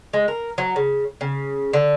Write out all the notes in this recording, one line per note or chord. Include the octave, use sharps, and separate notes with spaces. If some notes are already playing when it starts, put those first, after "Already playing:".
G#3
A#4
F#3
C#3
C#3
D3